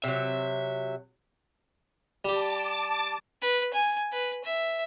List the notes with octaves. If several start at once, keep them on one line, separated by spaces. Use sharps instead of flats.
C3 F#3 E5
G3 G4 A5 D6
B4
G#5
B4
E5